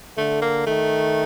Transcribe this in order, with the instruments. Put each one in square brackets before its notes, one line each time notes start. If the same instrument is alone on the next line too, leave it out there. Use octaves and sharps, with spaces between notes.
[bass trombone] D3 [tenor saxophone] A3
[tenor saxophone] A#3
[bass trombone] D#3 [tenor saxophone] A3